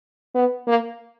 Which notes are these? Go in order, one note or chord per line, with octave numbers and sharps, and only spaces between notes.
B3
A#3